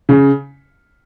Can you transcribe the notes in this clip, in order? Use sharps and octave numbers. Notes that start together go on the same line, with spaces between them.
C#3